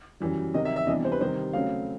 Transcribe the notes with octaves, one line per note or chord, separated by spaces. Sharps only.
F#2 C#3 E3 G3
C3 D#3 F#3 D#5
E5
E5
C3 E3 G3 B3 D4 D#5
C5
B4
C3 D#3 G3 C5
C#3 F#3 A3 C4 F5